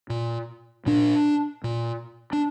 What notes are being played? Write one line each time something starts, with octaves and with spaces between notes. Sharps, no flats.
A#2
A#2 D4
A#2
D4